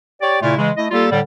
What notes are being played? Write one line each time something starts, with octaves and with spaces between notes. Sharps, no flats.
G4 C#5 D5
A#2 C#3 A3 E4 F4
C#3 E3 G#3
A3 E4 D#5
G3 A#3 F4 G4 A4
A2 D3 G3